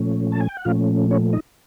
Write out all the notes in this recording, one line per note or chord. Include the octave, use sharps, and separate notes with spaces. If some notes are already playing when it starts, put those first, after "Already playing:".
Already playing: A#2 F3 A3 C#4
A5
G#5
G5
F#5
A#2 F3 A3 C#4 F4 F5
C#4 C#5
D#4 D#5